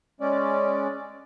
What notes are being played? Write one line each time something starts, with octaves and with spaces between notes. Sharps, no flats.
G#3 C#4 D5